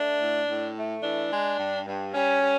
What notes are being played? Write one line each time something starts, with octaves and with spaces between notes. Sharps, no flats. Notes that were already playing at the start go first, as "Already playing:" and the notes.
Already playing: A3 D4
A2
A2
A3
E3 D4
G#3
G2
G2
G3 C#4
G3